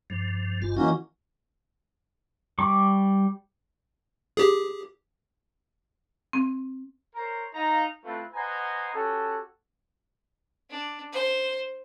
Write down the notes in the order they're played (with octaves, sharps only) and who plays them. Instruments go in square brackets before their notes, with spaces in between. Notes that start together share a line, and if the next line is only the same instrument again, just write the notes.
[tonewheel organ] G2 F3
G#1 G2 F4
[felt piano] E3 [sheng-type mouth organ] A#3 C#4 F#4 [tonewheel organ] D#5
[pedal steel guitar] G3 C#6 D6
[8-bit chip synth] G4 G#4
[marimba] C4
[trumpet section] A#4 C5 C#5 A#5
D#4 F5 A#5
A3 C4 E4 F4 B4
B4 C5 D#5 F#5 G#5 A#5
C#4 F#4 G4 A4
[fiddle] D4
C5